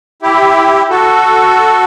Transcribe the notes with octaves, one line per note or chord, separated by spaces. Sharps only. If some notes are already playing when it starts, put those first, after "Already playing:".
E4 G4
F#4 A4